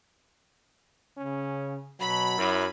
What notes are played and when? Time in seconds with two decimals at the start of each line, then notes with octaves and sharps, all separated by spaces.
1.17 C#3 C#4
2.00 B2 F#3 B5
2.38 F#2 E4